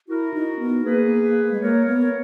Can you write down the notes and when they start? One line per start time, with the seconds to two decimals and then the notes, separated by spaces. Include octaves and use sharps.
0.09 E4 F#4 A#4
0.34 D#4
0.59 B3
0.85 A#3 G#4 B4
1.51 G#3
1.61 A#3 A#4 C#5
1.87 B3